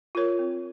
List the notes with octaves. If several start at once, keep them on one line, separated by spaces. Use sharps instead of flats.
F4 A#4 C#5
C4